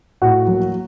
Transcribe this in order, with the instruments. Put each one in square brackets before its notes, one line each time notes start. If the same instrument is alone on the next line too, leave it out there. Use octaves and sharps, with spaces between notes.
[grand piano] A2 F#4 F#5
F#3 A#3